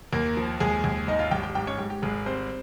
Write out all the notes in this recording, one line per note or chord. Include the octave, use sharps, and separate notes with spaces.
D#2 A#3 A#4
F3
D#2 G#3 G#4
D#2
G#1 D#4 D#5
F4 F5
G#1 G4 G5
G4 G5
G#2 G4 G5
C#4 C#5
G#2 G4
G4
G#1 G#3 G#4
G3 C4 C5